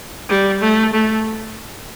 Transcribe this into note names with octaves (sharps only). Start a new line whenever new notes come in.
G3
A3
A3